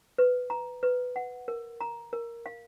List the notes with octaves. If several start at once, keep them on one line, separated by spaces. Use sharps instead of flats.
B4
A#5
B4
F#5
A#4
A#5
A#4
F5